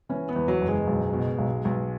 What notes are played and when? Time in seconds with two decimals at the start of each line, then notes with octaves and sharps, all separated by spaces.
0.09 E3 C#4
0.29 B3
0.36 E2
0.48 F#3
0.61 F#1
0.68 G#3
0.87 B1
1.13 B2
1.38 B1
1.65 B1